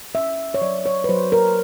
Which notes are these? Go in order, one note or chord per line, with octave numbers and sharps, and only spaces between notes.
C#4 E5
C#5
F#3 D5
C#5
B4
F#3 C5
A#4